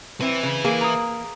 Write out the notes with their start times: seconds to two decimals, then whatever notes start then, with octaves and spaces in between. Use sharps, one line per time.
0.21 C4 B4 E5
0.43 C#3
0.64 A#3 G#4
0.81 A#5 D#6